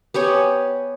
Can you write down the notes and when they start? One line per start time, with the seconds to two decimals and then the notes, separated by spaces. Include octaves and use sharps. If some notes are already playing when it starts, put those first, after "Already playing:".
0.14 B3 G4 C#5 G#5